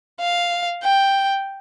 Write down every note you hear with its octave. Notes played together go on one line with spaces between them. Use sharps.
F5
G5